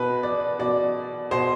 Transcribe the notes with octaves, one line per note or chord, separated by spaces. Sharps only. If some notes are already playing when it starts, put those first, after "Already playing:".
Already playing: B2 B4
D5
B2 D5
B2 C5